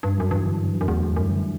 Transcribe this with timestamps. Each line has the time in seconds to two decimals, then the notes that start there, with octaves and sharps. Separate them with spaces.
0.03 G2 G3
0.18 F#2 F#3
0.31 G2 E3
0.46 D3
0.60 D3
0.74 F#3
0.81 F#2
0.88 E2 A3
1.03 A3
1.16 F#2 G3
1.31 D3